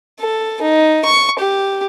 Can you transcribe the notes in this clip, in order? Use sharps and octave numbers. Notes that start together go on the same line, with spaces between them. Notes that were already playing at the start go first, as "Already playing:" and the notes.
A4
D#4
C#6
G4